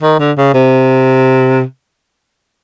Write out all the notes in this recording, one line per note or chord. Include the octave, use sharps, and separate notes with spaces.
D#3
D3
C#3
C3